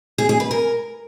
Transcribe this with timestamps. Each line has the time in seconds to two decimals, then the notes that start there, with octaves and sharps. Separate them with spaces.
0.18 G#4
0.29 G#4
0.40 B4
0.51 A#4